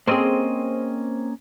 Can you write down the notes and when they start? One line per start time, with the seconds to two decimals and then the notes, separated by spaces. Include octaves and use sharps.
0.08 A#3 C4 C#4 G#4 D#5